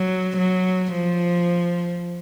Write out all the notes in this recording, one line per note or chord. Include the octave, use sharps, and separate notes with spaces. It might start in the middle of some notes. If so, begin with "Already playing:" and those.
Already playing: F#3
F#3
F3